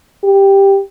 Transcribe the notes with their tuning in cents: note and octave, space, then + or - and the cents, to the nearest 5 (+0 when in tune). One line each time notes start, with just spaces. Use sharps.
G4 +5